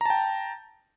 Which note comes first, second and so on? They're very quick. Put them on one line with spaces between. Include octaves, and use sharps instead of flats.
A#5 A5 G5